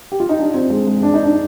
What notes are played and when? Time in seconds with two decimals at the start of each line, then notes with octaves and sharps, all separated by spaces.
0.12 G4
0.20 F4
0.29 D#4
0.39 D4
0.54 C4
0.70 G#3
0.87 G#3
1.03 D4
1.14 D#4
1.24 D4